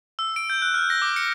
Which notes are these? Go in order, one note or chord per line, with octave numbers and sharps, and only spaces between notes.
E6
D7
G6
F#6
F6
A#6
D6
C#7